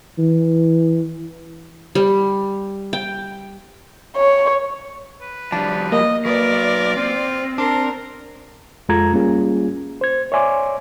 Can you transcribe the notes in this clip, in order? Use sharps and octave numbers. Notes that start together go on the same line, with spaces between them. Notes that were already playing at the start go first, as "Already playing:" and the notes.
E3
G3
G5
C#5
B4
F3 G3 D4
A#3 D#5
F#3 A#4 B4 D5
C4 F4
D4 A#4 C6
F2 G#3 F4 A4 A#5 G#6
G3 A#3 C#4 F4 G#4
C5 G#6
C#5 D5 E5 G#5 C6 D6